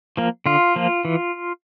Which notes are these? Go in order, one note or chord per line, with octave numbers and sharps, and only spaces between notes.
F3 A#3
D3 F4
F3 A#3
E3